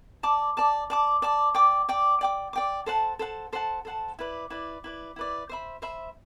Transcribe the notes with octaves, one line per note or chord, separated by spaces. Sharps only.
D5 A5 D6
D5 A5 D6
D5 A5 D6
D5 A5 D6
D5 G5 D6
D5 G5 D6
D5 G5 D6
D5 G5 D6
A4 C5 F#5 A5
A4 C5 F#5 A5
A4 C5 F#5 A5
A4 C5 F#5 A5
E4 B4 D5
E4 B4 D5
E4 B4 D5
E4 B4 D5
C5 E5 B5
C5 E5 B5